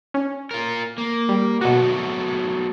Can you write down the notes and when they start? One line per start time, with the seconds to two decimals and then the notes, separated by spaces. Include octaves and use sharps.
0.14 C#4
0.51 F4 A#4
0.98 A#3
1.29 G3
1.61 B2 F#3 A3 B3 F#4